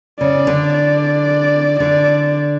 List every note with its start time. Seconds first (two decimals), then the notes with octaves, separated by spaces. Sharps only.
0.20 C#3 D5
0.47 D3
0.73 D5
1.80 D3 D5